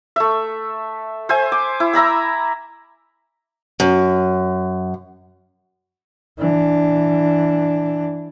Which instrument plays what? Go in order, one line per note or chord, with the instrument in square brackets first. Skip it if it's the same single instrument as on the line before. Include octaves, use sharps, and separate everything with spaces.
[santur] A3 E5
C5 E5 G#5
D6
E4
E5 A#5 B5 E6
[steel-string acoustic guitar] F#2
[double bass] E3 D4